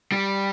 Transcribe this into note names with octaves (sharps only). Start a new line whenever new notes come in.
G3